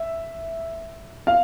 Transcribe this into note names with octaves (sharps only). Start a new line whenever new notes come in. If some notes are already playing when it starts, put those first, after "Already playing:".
Already playing: E5
F5